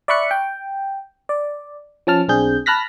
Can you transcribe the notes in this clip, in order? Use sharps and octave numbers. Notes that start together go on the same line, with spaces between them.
D5 E5 B5 C#6 F#6 C#7
G5
D5
F3 C#4 A5 F6
B1 C4 D4 G#4 G6
A5 B5 F6 F#6 A#6 B6